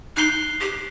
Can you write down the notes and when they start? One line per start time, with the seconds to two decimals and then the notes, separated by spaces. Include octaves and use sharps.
0.17 D#4 F#6 C7 G7
0.61 G4